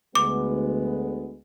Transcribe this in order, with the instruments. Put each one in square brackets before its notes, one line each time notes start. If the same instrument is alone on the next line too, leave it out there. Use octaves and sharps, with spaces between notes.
[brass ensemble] D2 G#3 B3 [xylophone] D6